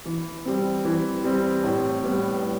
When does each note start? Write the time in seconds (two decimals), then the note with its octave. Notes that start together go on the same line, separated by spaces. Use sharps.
0.06 E3
0.45 G3 C4
0.85 E3
1.24 G3 C4
1.64 A2
2.03 G3 B3
2.43 A2